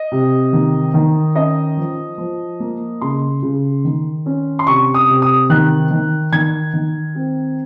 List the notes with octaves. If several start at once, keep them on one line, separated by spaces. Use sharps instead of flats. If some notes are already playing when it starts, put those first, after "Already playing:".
Already playing: D#5
C3
D#3
D#3
C#4 D#5
F3
F3
A#3
C#3 C6
C#3
D#3
C#4
C6
C3 C#6
D#6
C3
D#6
D#3 F#6
D#3
D#3 G#6
D#3
C4